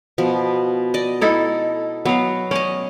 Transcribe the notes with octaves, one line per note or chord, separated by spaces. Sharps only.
B2 F3
D5 D#5
D#4 E4 A4
F#3 B3 F5
C#4 D5 D#5